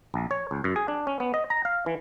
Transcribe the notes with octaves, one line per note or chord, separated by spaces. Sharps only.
A#1
C#5
C#2
F#2
G#4
D4
C#4
B3
D#5
A#5
F5
E3